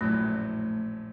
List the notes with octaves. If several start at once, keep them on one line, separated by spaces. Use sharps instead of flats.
A#1 F#2 A2 A3